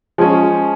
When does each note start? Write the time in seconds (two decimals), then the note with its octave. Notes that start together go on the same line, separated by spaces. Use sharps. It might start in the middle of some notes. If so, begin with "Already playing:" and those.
0.18 F3 G#3 C#4